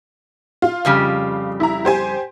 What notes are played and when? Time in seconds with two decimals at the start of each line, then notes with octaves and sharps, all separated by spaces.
0.62 F4
0.85 F2 C#3 G3
1.60 E4 A#5
1.85 G4 C5 G#5